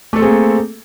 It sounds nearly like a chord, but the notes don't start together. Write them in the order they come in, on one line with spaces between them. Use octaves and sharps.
A3 A4 C4 G#4 A#3